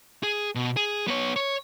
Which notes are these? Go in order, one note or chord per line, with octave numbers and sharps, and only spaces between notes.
G#4
B2
G#4
B3 C#5
C#5